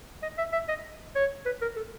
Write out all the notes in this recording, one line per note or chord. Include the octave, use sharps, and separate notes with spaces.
D#5
E5
E5
D#5
C#5
B4
A#4
A4